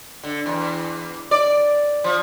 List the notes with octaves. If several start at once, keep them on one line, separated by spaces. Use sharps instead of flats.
D3
E2
D5
F3